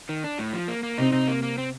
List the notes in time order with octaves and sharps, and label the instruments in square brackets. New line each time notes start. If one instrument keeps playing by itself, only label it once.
[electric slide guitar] D#3
D4
A2
F3
A#3
A#3
[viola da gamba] C3 C4 [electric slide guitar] D#4
[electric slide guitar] D#4
A#3
A#3
C4